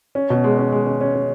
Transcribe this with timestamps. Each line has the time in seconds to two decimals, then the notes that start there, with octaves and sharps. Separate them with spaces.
0.15 C#4
0.30 B2
0.44 G#3
0.58 C#4
0.72 G#3
0.87 C#4
1.01 C#4
1.15 C#4